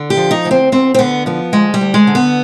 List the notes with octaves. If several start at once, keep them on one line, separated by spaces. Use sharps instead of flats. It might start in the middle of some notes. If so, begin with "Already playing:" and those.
Already playing: D3
G4
F3
D#4
D2
C4
D2 C4
C4
D3 B3
F3 B3
D2 G#3
G3
D2
G#3
D3
B3